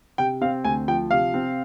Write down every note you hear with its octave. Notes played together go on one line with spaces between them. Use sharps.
C3 G5
C4 F5
D2 G#5
F3 G5
C3 F5
C4